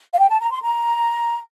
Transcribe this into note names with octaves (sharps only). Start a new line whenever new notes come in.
F5
G5
A5
A#5
C6
A#5